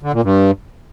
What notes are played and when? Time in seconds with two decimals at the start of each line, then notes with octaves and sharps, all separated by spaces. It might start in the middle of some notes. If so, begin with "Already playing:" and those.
0.03 D3
0.13 A#2
0.24 G2